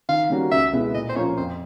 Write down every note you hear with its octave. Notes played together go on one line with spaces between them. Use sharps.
D#3 F5
G3 A#3 C#4 F#4
C#2 E5
B2 G#3 B3 E4
A#2 D#5
C5
F3 A#3 C#4 F4 C#5
F2 C5